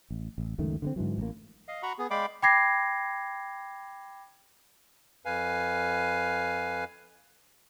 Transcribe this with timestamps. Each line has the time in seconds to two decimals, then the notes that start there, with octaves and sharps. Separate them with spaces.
0.10 A1
0.38 A1
0.58 C#2 F#2 D#3 A3
0.82 D3 G#3 C4
0.96 G#2 D3 E3 F#3
1.18 A1 A#3
1.68 D#5 F5
1.83 F#4 F#5 A#5 B5 C#6
1.98 B3 G#4
2.11 G#3 D5 F5 G5 B5 D6
2.43 G5 B5 D6 G#6 A#6 C7
5.25 F2 B4 F5 G#5